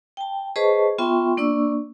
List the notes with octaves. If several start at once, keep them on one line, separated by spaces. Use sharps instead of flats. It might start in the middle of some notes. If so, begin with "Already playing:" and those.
G5 A5
G#4 B4 C5 D#5 A5 C#6
B3 F4 E5 G5 C6 C#6
A#3 D4 D5 C#6 E6